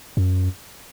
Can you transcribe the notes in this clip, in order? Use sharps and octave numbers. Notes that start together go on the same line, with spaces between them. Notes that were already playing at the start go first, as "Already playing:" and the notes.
F#2